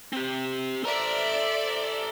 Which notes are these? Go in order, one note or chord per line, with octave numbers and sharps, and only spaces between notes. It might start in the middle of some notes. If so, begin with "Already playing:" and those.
C4 G4
A4 C5 D5 E5 A#5